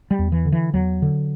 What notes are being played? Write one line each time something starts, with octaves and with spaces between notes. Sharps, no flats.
G3
E2
E3
D3
E3
E2 F#3
D3